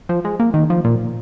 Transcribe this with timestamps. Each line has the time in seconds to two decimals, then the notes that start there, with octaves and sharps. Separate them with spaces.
0.09 F3
0.25 G#3
0.40 A#3
0.54 D#3
0.70 F3
0.85 A#2